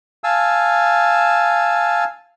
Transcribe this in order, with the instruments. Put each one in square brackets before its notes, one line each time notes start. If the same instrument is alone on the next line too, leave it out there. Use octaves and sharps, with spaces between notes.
[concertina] F5 G#5 A5 E6